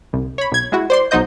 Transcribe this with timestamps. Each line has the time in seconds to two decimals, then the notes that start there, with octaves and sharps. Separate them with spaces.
0.13 C2
0.38 C#5 B5
0.52 B1 G#6
0.72 G#3 E4 F#4
0.90 C5 D5 C6
1.11 B1 F#3 D#4 C5 D#5 G6